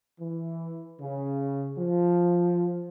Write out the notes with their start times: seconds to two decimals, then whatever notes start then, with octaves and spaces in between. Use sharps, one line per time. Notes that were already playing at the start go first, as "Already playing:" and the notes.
0.20 E3
1.00 C#3
1.78 F3